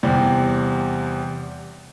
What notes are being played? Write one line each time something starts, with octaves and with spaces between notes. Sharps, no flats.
E2 C3 G3